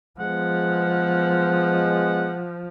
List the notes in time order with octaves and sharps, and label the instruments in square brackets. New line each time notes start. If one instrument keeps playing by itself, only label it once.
[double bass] F3 [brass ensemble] G#3 B3 [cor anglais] F#5